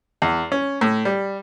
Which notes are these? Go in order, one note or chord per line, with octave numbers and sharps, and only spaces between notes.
E2
C#4
A2
G3